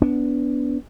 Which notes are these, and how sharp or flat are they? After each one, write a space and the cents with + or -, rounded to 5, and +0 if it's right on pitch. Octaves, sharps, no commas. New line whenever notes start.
B3 +0 D4 -25